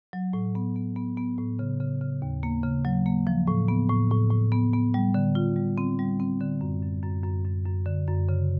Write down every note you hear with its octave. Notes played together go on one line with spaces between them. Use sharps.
F#3
A2
B3
B3
B3
B3
A2
C#3
C#3
C#3
D#2
A#3
C#3
F#3
A#3
F3
A2
B3
A2
A2
A2
B3
B3
G3
D3
F4
G3
C4
G3
C4
D3
F#2
F#2
F#2
F#2
F#2
F#2
D3
F#2
C#3